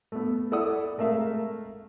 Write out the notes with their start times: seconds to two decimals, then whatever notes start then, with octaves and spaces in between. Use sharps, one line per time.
0.12 A3 B3
0.51 E4 A4 D5 F#5 D#6
0.98 G#3 A3 A#4 E5 F5